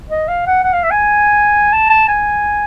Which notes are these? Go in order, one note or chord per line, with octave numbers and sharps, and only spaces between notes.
D#5
F5
F#5
F#5
F5
E5
G#5
A5
A5
G#5